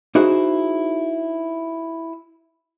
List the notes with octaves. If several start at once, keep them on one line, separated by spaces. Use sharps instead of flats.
D#4 E4 F#4 G#4 C5